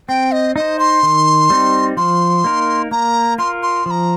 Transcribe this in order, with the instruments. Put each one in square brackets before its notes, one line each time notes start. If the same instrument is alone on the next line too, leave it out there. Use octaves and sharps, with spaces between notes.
[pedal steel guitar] C4 [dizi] G5
[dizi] D#5
[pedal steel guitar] D#4 C5 [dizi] D#5
[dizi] C6
[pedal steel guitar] D#3
G3 C4 D#4
[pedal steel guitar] F3 [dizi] C6
[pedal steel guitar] A#3 D#4 A#4
[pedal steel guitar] A#3 [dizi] A#5
[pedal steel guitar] F4 A#4 [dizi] C6
[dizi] C6
[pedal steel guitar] F3 [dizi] C6
[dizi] A#5